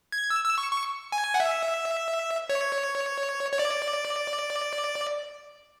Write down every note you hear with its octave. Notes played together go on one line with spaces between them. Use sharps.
G#6
E6
E6
C#6
C#6
G#5
F#5
E5
C#5
C#5
D5